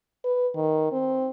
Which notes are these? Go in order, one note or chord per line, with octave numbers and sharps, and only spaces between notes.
B4
D#3
C4